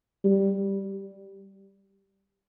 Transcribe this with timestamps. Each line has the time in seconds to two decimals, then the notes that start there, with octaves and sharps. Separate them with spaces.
0.24 G3